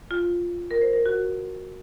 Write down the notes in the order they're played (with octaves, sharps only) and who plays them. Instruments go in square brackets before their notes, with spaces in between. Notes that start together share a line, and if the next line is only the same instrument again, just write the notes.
[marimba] F4
A#4
C5
A#4
F#4